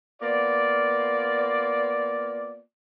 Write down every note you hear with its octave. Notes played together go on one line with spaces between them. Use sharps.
A#3 B3 F4 D5